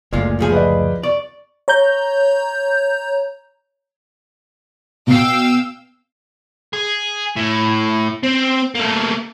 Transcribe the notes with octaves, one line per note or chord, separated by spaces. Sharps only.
F#1 D2 A#2 G#3 A3 F4
D#2 F3 G#4
B4 D5 D#5
D5 C#6
C#5 A#5 G6
B2 F5 G5 E6 C7
G#4
A2
C4
A3 A#3